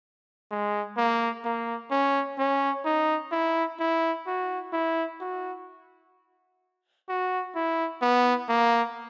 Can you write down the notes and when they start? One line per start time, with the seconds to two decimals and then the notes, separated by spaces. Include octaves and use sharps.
0.51 G#3
0.97 A#3
1.45 A#3
1.91 C#4
2.39 C#4
2.85 D#4
3.32 E4
3.80 E4
4.27 F#4
4.73 E4
5.21 F#4
7.09 F#4
7.55 E4
8.02 B3
8.49 A#3